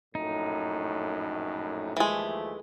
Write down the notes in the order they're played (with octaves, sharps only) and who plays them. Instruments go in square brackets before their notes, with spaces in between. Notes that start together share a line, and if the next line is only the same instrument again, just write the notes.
[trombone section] A#1 F#2 A2 [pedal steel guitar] D#4
[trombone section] D#2 F3 A3 [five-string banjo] E3 G#3